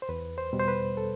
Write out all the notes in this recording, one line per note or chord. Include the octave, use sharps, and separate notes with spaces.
C5
E2 B4
C5
B2 G3
C5
B4
A4